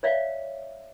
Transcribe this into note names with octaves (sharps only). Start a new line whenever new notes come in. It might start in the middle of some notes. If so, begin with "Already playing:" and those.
C#5 D5 E5 F5